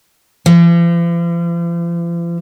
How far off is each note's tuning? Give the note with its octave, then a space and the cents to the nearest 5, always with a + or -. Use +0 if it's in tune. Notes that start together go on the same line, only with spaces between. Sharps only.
F3 -45